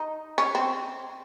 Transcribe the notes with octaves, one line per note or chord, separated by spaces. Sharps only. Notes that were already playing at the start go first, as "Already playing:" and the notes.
Already playing: D#4
C#4
C4